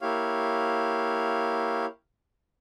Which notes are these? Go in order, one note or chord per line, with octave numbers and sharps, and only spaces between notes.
A#3 E4 G4 C#5 F5